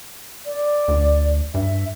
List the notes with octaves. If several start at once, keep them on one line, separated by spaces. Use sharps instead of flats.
D5
D2
G2 E5